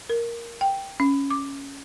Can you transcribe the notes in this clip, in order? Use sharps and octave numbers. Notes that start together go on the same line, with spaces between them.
A#4
G5
C#4
D6